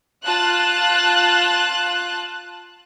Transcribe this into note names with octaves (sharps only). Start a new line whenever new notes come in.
F4 A5 F#6